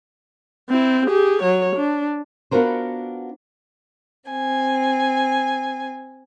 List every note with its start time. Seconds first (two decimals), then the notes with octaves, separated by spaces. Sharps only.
0.69 C4 E4
1.06 G4 G#4
1.42 F#3 C#5
1.76 D4
2.51 B3 D4 F4 F#4 A#4 C5
4.30 C4 G#5